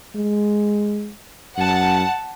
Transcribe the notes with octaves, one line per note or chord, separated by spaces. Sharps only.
G#3
F#2 F#5 A5